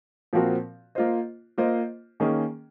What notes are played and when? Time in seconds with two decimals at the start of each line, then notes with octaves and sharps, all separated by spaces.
0.33 A#2 F3 C4 F#4 A#4
0.95 A#3 F4 C5 D#5
1.58 A#3 F4 C5 D#5
2.20 D#3 A#3 C#4 G#4